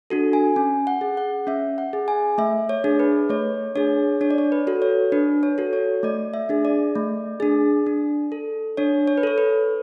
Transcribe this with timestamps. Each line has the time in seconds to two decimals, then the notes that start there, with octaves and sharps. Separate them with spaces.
0.10 D4 F#4 A4
0.33 G#5
0.56 C#4 G#5
0.87 F#5
1.01 G#4
1.17 F#5
1.47 C#4 E5
1.78 F#5
1.93 G#4
2.08 G#5
2.38 A3 E5
2.69 C#5
2.84 D4 G#4
2.99 B4
3.29 A3 C#5
3.75 D4 G#4 C#5
4.21 D4 C#5
4.31 D5
4.38 C#5
4.52 B4
4.67 F#4 A4
4.82 C#5
5.12 D4 B4
5.43 C#5
5.58 F#4 A4
5.73 C#5
6.03 A3 D5
6.34 E5
6.49 D4 G#4
6.65 D5
6.95 A3
7.40 D4 G#4
7.87 D4
8.32 A4
8.77 D4 C#5
9.08 C#5
9.17 B4
9.23 A4 C#5
9.38 B4